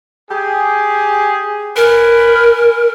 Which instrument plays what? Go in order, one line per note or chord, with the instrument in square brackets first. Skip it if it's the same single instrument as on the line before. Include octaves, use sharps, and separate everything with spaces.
[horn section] G4 G#4
[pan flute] A#4 [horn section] B4 G#5 B5